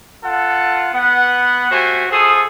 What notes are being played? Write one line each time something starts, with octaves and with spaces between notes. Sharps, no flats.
F4 A4 F#5
B3 F#5
A3 F#4 G4 C5 G#5
F4 G#4 A4 C5 D#6